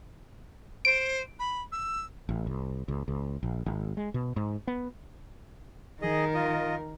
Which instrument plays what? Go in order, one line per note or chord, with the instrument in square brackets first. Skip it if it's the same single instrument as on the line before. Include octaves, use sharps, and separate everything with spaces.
[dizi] C5 [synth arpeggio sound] D7
[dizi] B5
E6
[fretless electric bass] A1
C2
C#2
C#2
A#1
G#1
G#3
B2
G#2
B3
[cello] D#3 A#4 [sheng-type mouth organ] G#4 D#5
[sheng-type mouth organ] F4 D#5